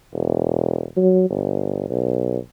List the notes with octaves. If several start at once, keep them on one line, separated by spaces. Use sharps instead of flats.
E1
F#3
G1
B1